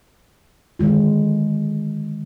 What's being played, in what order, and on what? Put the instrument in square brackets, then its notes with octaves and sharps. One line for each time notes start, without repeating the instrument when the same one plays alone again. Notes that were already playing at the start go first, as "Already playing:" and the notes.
[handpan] D3 D#3 G#3 F4